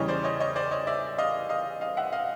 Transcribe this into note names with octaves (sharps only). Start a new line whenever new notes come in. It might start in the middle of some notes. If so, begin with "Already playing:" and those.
Already playing: E2 C#3 E3 G3 C#5 D#5
C5 D5
C#5 D#5
C#5 D#5
C5 D5
C#5 D#5
D5 E5
D#5 F5
D#5 F5
D#5 F5
E5 F#5
D#5 F5